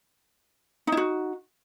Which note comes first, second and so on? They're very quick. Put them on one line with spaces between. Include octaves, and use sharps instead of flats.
D#4 E4 F#4